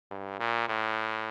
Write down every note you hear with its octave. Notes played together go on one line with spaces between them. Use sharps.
G2
A#2
A2